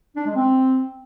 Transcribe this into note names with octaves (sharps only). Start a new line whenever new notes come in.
D4
G#3
C4